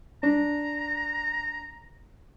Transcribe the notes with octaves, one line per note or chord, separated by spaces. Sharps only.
D4 A#5